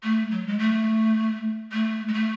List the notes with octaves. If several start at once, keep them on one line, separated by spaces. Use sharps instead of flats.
A3
F#3
G#3
A3
A3
G#3
A3